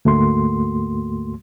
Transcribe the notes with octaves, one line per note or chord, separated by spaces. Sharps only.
D2 G#2 A3 A#3 F#4 C6